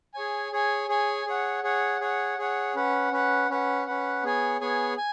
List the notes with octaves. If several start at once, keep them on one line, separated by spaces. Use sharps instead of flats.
G#4 C#5 G#5
G#4 C#5 G#5
G#4 C#5 G#5
G#4 C#5 F#5
G#4 C#5 F#5
G#4 C#5 F#5
G#4 C#5 F#5
C#4 B4 F#5
C#4 B4 F#5
C#4 B4 F#5
C#4 B4 F#5
B3 G#4 C#5 G#5
B3 G#4 C#5 G#5
G#5